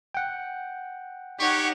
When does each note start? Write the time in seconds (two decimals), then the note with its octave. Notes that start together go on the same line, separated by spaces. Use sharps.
0.14 F#5 G5
1.39 D#4 G4 C#5 F#5 C#6